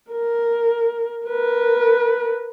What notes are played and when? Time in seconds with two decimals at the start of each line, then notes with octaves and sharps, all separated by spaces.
0.11 A#4
1.26 A#4 B4